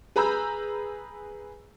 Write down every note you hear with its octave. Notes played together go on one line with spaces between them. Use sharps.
G#4 B4 A#5 B5 E6 G6